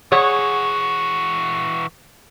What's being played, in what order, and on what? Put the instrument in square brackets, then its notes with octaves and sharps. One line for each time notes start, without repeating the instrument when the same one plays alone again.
[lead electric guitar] E3 F#4 [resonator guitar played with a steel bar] G#4 C#5 F#5